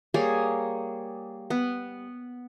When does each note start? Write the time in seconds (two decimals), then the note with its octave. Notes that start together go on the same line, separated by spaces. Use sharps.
0.14 G3 A#3 G#4 C#5
1.50 B3